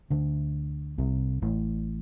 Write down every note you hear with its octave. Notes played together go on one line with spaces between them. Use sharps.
D2 D3
C2 C3
A1 A2